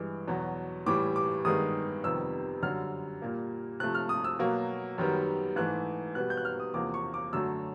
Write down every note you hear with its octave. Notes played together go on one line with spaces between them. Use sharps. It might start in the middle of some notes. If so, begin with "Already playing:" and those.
Already playing: G2 E3 G#3
E2 B2 F#3
A2 E3 G3 D6
D6
G2 D#3 G#3 B3 D#6
F2 C3 D#3 G3 B3 E6
F#2 D3 G3 F6
A#2 G3 A#3
C3 F3 A3 F#6
F6
D#6
E6
B2 F#3 A#3
F#2 D#3 G3 B3
G#2 E3 A3 F#6
B2 G3 B3 F#6
G6
F#6
F6
D#6
E2 C3 F3 A#3 D6
C#6
D6
F#2 D3 F#3 A3 E6